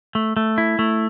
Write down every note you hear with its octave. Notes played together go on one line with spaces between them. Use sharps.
A3
A3
E4
A3